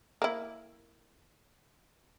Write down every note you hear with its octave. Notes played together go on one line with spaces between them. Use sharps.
A#3 E4